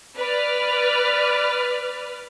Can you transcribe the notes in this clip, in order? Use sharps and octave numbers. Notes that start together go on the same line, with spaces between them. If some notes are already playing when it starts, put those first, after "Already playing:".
B4 D5 F6